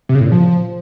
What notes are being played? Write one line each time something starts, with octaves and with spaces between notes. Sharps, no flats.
C3
C#3
A2
A#2
F3